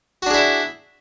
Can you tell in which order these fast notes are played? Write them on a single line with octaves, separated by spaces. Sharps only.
F#4 D4 G#4 E4